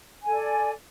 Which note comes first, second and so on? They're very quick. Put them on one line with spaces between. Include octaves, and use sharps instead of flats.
G#5 A4 D5